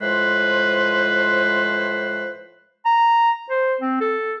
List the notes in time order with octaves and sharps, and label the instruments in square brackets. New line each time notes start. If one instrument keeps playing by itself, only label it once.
[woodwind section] A2 F3 G#3 B4 C5
[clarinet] A#5
C5
C4
A4